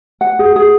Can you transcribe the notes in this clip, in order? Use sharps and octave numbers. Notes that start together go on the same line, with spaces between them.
F#5
G#4
G#4